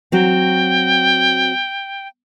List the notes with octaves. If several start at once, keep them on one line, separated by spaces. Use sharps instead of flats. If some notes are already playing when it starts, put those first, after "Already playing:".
F#3 C4 F#4 G5